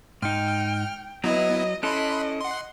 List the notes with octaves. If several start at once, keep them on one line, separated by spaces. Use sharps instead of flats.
G#2 D#4 G5 F6
F#3 B3 E4 D#5
C#4 E4 A4 D#5 B5 C6 F#6
F#5 C6